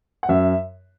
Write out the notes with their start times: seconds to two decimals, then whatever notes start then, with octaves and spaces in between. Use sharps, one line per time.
0.23 F#5
0.29 F#2 E5